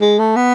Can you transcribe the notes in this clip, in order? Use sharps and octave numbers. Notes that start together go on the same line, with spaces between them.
G#3
A3
B3